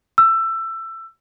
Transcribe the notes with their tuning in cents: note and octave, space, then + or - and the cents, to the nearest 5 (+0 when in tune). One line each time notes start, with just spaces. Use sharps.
E6 +20